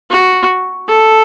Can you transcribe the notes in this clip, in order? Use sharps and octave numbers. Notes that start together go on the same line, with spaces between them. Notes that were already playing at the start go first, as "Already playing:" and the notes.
F#4
A4